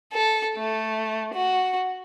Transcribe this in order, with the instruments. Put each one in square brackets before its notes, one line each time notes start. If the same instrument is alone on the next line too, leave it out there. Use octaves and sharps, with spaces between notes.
[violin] A4
A3
F#4